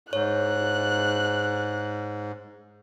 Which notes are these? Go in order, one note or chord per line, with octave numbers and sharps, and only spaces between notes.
G#2 C#5 F#6